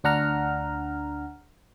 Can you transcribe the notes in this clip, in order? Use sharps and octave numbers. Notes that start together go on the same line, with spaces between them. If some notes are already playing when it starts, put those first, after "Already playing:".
D2 D4 F#5 A#5 F6